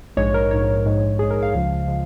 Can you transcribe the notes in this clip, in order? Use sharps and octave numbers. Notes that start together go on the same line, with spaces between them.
A#1 G#2 G#3 C#5
A#4
A#1 G#2 G#3 C#5
A#1 G#2 G#3
A#1 G#2 G#3 G#4
A#4
F5
C#2 C#3 F3 G#3
C#3 F3 G#3